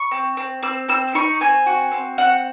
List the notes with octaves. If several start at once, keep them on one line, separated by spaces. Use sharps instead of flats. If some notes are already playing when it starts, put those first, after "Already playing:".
Already playing: C#6
C4
C4
C4 E6
C4 E6
D#4 C#6
C4 G#5
F#4
C4
C4 F#5